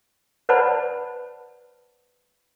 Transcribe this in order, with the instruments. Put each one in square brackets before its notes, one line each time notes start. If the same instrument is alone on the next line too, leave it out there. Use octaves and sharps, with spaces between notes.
[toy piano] B4 C5 D5 F#5 A5 B5